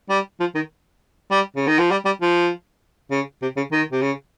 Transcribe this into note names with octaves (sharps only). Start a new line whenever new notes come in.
G3
F3
D#3
G3
C#3
D#3
F3
G3
G3
F3
C#3
C3
C#3
D#3
C3
C#3